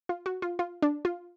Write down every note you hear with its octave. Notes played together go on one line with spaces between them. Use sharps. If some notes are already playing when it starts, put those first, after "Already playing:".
F4
F#4
F4
F4
D4
F4